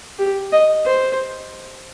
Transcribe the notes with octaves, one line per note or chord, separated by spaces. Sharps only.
G4
D#5
C5